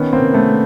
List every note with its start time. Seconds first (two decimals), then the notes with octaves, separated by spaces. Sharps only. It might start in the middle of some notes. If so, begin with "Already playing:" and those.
Already playing: D#3 B3 C#4
0.13 A#3 C4
0.19 C3
0.34 A3 B3